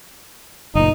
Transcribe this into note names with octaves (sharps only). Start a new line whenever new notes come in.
F#1 A#2 D#4